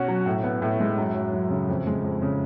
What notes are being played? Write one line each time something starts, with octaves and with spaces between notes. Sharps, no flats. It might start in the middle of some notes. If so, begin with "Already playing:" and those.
Already playing: B2 C#4 F#4
F#3
A2
B3
A2
G#3
F#2
F#3
F#2
C#3
F2
G#3
F2
C#3